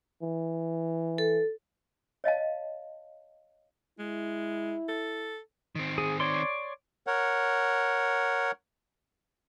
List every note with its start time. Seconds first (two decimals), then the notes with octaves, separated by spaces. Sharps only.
0.23 E3
1.18 A4
2.24 C#5 D#5 F5 A5
3.99 G#3 E4
4.89 A4
5.76 D#3 C4
5.98 G#4
6.20 C#5 D5 C6
7.07 A#4 C#5 F#5